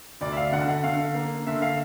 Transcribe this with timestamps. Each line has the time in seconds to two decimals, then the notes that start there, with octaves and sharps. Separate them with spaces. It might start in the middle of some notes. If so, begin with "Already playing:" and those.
0.21 D2 D5
0.32 E5
0.37 F5
0.52 D3 F#5
0.68 F#5
0.84 D3 F5
1.15 A#3
1.47 D3 E5
1.62 F5